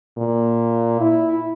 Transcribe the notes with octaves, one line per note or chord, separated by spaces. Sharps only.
A#2
E4